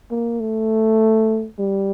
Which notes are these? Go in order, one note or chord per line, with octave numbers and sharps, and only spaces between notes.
A#3
A3
G3